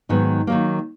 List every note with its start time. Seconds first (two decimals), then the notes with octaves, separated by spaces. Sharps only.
0.09 G#2 D#3 F#3 B3 D#4
0.47 D#3 F#3 A#3